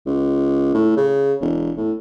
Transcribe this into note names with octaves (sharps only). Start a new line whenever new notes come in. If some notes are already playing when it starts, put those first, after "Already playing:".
C#2
A2
C#3
E1
A2